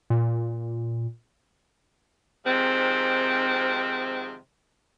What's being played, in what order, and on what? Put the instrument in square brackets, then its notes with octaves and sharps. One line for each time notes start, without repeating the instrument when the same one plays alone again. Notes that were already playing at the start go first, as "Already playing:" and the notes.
[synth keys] A#2
[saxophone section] G#2 C3 D#3 F3 C4